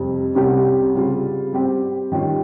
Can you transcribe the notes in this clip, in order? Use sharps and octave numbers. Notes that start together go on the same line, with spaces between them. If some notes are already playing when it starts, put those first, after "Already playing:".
Already playing: F2 C3 G3
C2 C3 G3 C#4 G4
C#3 G3 C4 F4
G3 C4 G4 C5
D#3 G3 C#4 F4